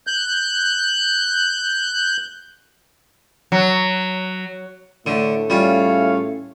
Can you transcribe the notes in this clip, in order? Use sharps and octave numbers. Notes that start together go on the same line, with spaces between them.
F#6 G6
F#3
A2 D3 A3
G3 C#4 F4 G#4 C#5 F5